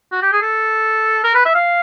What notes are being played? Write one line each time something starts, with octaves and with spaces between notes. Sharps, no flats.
F#4
G4
G#4
A4
A#4
B4
E5
F5